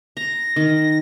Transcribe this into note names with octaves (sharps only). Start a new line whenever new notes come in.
A#5 A#6
D#3